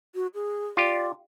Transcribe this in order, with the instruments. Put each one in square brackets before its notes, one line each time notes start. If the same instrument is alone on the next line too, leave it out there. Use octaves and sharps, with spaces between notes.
[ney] F#4
G#4
[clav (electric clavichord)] F4 G4 [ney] D5